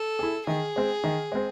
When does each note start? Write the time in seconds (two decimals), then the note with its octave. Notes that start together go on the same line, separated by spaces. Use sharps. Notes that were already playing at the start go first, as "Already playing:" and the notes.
Already playing: A4
0.19 E4 G#4
0.47 D#3 G#4
0.76 G#3 C4
1.04 D#3
1.32 G#3 C4